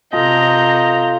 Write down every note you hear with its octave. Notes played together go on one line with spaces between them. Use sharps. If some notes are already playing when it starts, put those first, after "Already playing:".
C3 F4 A4 D#5 A#5 G6